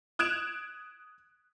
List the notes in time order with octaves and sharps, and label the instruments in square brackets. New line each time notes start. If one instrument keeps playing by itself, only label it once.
[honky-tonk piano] D#6 F#6 G#6 D7 E7 F7